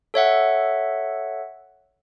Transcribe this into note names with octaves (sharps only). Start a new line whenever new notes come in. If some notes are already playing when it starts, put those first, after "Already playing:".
A4 C#5 E5 F#5